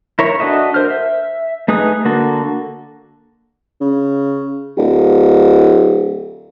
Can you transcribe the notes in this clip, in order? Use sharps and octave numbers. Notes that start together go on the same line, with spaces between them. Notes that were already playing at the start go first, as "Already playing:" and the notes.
E4 A#4 C#5
D4 F#4 A4 D#5 E5
A#4 C5 F6
E5
A3 D#4 G#4 B4 D#6
D3 A#3 F#4 A4
C#3
D1